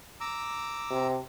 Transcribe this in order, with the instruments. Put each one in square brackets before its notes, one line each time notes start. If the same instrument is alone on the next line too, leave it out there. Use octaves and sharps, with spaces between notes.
[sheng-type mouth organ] A#5 D6 E6
[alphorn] C3